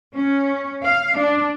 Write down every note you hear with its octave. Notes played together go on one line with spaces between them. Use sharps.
C#4
F5
D4